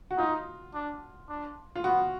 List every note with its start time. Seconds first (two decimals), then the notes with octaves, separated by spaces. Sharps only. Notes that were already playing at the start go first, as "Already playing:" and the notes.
0.11 F#4
0.18 D#4 F4
0.74 D4
1.29 D4
1.76 F4
1.84 B3 F#4